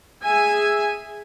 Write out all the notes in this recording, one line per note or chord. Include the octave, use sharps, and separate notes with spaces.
G#4 E5 G#5